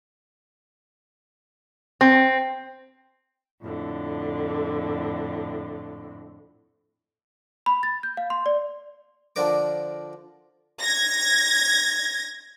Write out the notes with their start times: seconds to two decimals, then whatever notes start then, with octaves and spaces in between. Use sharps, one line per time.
2.01 C4
3.63 F2 A2 D3
7.66 B5
7.83 A6
8.03 G6
8.17 F5
8.30 C6
8.46 D5
9.36 D3 F3 D4 A#4 D6
10.80 G#6 A#6